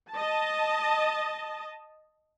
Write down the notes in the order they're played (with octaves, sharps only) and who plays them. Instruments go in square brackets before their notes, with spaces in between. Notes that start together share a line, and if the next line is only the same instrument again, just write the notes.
[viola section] D#5 A5